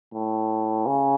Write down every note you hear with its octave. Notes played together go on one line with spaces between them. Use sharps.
A2
C#3